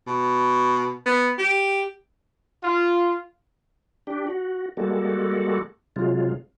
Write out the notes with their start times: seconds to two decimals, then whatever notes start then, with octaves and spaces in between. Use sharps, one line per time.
0.07 B2
1.06 B3
1.39 G4
2.63 F4
4.07 D4 G4
4.27 F#4
4.77 G3 G#3 A#3 F#4 A4
5.96 C3 F#3 G#3 F4